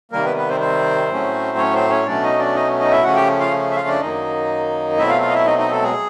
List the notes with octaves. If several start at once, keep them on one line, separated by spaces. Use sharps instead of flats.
C3 D#3 G3 A#3 A#4
B3 B4
B3 B4
C4 C5
C4 C5
A2 F#3 A3 C#4
C#4 C#5
C4 C5
C#4 C#5
B2 F#3 A3 C#4 D4 D5
D#4 D#5
D4 D5
D#4 D#5
D#4 D#5
E4 E5
C#3 F3 A3 C#4 F#4 F#5
G4 G5
F4 F5
E5
F4 F5
D4 D5
F#2 D#3 F#3 A#3 D#4 D#5
B2 F#3 A3 C4 E4 E5
F4 F5
F4 F5
D#5
E4 E5
D#4 D#5
D#4 D#5
A3 A4
G#3 G#4